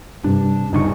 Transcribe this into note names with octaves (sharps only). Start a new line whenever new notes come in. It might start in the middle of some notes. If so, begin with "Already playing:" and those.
G2 C3 D4
D1 G2 C#3 D#4 C#6